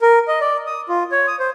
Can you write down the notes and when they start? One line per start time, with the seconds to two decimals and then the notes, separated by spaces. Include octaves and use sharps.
0.02 A#4
0.28 D#5
0.41 D5
0.67 D#6
0.89 F4
1.12 C#5
1.27 D#6
1.39 C5